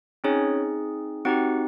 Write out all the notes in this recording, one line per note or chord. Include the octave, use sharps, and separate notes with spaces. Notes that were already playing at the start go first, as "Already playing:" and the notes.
C4 C#4 D#4 G#4 C#5
C4 D#4 F#4 G4 F#5